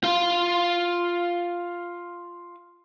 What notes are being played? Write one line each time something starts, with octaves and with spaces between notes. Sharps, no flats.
F4 F5